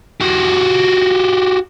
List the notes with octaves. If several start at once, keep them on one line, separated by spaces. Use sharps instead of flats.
F#4 G4